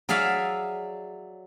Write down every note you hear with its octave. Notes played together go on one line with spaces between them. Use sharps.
F#3 G#4 D5 E5 F5